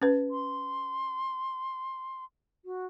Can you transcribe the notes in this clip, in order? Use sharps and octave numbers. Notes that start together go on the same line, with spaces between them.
C#4 B4
C6
F#4